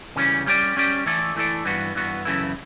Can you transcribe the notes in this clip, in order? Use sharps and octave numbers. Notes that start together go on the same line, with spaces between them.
C#3 E3 G3 C#4
G3 C#4 G4 D5
G3 C#4 G4 D5
E3 A3 E4 A4 D5
E3 A3 E4 A4 D5
G2 E3 B3 F#4
G2 E3 B3 F#4
F#2 C#3 E3 A3 E4